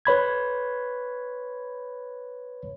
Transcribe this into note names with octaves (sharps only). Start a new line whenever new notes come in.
B4 C#5 B5 G#6